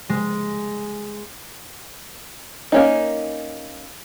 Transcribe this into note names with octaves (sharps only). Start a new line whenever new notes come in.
G#3
A#3 C#4 D#4